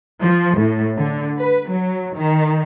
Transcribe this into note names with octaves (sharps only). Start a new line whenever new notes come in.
F3
A2
D3
B4
F#3
D#3